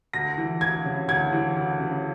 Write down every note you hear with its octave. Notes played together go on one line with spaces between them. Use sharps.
D2 A#6
E3
D2 G#6
C#3
D2 G#6
E3
D2
C#3